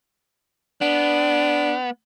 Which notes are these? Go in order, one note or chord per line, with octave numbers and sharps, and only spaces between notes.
B3 D4